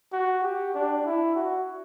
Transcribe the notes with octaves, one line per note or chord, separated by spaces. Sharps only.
F#4
G4
D4
E4
F#4